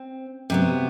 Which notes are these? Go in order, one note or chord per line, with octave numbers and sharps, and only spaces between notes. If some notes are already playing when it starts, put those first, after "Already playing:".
Already playing: C4
C3 F#3 B3